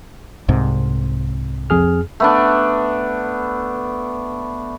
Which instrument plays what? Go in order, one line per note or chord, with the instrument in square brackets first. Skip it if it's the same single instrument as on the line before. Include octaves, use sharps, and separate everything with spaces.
[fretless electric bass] C2 G#2 C3
[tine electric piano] F2 G#4 F6
[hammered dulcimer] A3 B3 D4